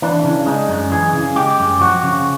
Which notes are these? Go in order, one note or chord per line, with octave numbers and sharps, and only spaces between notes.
E3 D4
C#3
G#3 D#4
F#2
E3 G#4
C#3
G#3 G4
F#2
F3 F#4
C#3